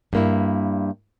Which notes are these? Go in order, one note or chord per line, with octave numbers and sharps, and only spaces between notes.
G2 A#3 E4